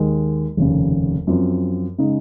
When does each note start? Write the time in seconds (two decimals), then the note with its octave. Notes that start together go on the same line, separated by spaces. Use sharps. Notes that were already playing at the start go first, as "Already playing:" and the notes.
Already playing: D#2 D#3 G#3
0.57 F1 D#2 C#3
1.27 F#2 F3 C4
1.98 C#3 G#3 D#4